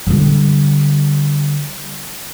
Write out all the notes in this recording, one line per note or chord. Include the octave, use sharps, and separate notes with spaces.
D3 G3